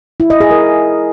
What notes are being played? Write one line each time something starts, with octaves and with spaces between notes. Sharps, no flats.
E4
D#5
G#4
A#4